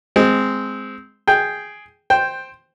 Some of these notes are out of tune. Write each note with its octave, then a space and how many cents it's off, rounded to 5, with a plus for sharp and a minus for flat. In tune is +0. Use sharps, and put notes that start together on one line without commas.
G#3 +0 C4 -10
G#4 +0 G5 +0
C5 +5 G5 +0